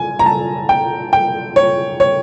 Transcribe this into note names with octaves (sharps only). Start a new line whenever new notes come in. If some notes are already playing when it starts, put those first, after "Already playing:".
Already playing: G#5
A#5
A5
G5
G5
C#5
C#5